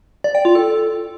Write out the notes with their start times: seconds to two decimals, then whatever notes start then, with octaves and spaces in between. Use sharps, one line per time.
0.24 D5
0.35 G5
0.45 F4
0.55 A4